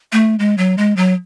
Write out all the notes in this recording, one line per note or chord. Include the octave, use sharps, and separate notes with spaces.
A3
G#3
F#3
G#3
F#3